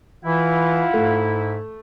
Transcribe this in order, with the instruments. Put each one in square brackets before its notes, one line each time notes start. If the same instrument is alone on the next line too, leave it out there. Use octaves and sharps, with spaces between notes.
[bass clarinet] E3 [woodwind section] E4 [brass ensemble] F4 F5 F#5
[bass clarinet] G#2 [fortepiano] A3